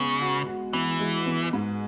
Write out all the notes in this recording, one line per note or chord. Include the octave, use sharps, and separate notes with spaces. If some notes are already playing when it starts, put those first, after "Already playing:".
Already playing: C#3 G#3 B3
F#4
F#4
E3 B3
G#3
B3
G#2